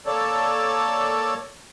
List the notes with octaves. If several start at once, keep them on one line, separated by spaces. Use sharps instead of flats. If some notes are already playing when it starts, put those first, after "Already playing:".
A#3 A4 C#5 D5 A5